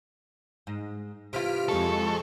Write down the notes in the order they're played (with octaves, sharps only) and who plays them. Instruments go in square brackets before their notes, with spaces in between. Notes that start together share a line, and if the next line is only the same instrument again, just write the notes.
[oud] G#2
[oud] C3 E3 F4 [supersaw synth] F6 B6 D7
[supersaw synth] F2 G#3 C#6 [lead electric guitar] A4